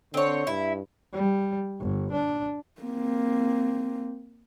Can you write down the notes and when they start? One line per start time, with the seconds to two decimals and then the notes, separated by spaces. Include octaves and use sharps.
0.14 D3 C4 C#5
0.47 G2 E4
1.13 G3
1.80 G1
2.12 D4
2.82 A#3 C4